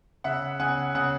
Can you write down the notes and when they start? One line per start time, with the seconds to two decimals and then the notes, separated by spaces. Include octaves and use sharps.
0.24 C#3 E5 F#5
0.59 C#3 F#5 G#5
0.95 C#3 F#5 G#5